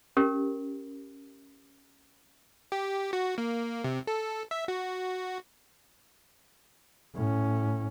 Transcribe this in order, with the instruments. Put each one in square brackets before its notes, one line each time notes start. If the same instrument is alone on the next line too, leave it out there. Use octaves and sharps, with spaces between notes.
[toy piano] C#4 G4 A#4
[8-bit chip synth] G4
F#4
A#3
C3
A4
E5
F#4
[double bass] A2 C#4